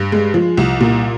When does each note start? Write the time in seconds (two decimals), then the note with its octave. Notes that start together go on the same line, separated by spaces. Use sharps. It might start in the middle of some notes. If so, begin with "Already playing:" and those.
Already playing: G2
0.12 G#3
0.34 F3
0.57 C2
0.81 A#2